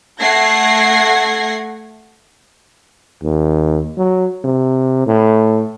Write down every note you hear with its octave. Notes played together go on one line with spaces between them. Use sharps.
A3 F#5 G#6 A#6 C7
D#2
F#3
C3
A2